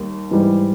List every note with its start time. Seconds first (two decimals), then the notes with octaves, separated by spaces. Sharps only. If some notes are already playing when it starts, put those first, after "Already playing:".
Already playing: D#2 G3
0.31 G#2 E3 G3